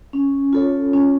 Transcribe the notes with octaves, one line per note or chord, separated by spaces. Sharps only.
C#4
F4 A4 C#5
C#4